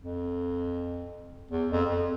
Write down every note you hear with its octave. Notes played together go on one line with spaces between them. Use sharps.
F2
E2
F2
F2